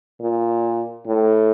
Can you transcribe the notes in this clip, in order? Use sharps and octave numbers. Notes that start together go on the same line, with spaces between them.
A#2
A2